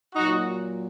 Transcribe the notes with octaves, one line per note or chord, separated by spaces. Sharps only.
A#2 F#3 D#4 F#4